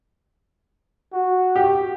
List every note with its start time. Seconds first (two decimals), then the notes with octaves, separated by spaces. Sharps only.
1.13 F#4
1.56 G4